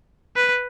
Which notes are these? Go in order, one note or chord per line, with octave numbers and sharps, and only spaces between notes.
B4